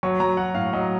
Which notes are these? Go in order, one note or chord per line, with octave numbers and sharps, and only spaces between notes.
F#3 C#6
F#3 A#5
F#3 F#5
A2 F5
F#3 D#5